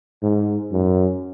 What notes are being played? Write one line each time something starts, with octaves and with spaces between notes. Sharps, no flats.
G#2
F#2